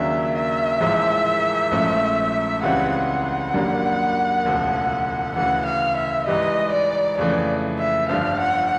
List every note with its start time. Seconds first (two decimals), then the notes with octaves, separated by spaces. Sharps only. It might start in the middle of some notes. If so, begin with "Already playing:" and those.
Already playing: D#2 C#3 F#3 A#3 D4 E5
0.35 E5
0.80 A1 G#2 F3 G#3
1.71 A#1 G#2 F3 A3 C#4
2.62 C#2 C#3 E3 G3 C4 F#5
3.08 F#5
3.54 G#1 F#2 D3 G3 A#3
4.45 E1 D2 C#3 F3
5.36 D2 C#3 E3 F#5
5.66 F5
5.97 E5
6.26 G#2 E3 G3 D#5
6.72 D5
7.17 F2 C#3 E3 A3 D5
7.79 E5
8.09 G1 G2 D3 F3 F5
8.39 F#5